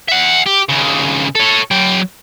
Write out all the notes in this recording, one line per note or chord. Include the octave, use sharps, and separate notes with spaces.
E5 F#5
G4
D#2 C#3
A4 C#5
F#3 G5